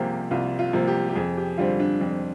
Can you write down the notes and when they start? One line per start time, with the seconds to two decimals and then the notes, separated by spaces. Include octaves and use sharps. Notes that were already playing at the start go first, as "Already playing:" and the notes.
Already playing: C2 C3 F3 A#3 G4 G#4
0.31 C2 F4
0.59 F4
0.73 C3 F3 A#3
0.88 G4
1.09 G4
1.16 F2 G#4
1.37 G4
1.58 D3 G3 C4 F4
1.80 D4
2.01 F2 D4